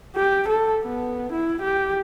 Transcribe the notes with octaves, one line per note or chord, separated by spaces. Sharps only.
G4
A4
B3
E4
G4